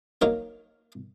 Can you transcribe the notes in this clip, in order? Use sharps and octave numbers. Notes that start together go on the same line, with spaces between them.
F#3 A#3 D#4 A#4 C#5